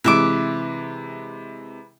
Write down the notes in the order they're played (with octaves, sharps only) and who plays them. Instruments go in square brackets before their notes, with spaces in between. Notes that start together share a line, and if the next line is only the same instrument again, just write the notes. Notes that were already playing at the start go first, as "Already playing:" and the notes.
[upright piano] C3 E3 G#3 [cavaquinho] B4 E5 D6